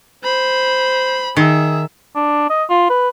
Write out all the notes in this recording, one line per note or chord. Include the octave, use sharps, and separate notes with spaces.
C5 B5
D#3 G#4 E5
D4
D#5
F4
B4